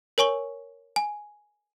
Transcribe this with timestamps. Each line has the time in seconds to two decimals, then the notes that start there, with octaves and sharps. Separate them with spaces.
0.18 A#4 C#5 G#5 C#6 G7
0.96 G#5